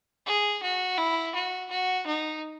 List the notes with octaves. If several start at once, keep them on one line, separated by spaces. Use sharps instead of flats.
G#4
F#4
E4
F#4
F#4
D#4